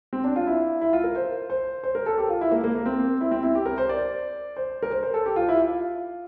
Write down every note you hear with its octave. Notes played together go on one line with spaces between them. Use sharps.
C4
D4
F4
E4
E4
F4
A#4
C5
C5
C5
A#4
A4
G4
F4
E4
A#3
A#3
A#3
C4
E4
C4
E4
G4
A#4
C5
D5
C5
A#4
C5
C5
A4
G4
F4
E4
F4